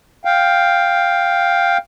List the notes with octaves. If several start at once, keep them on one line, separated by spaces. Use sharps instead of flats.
F5 G5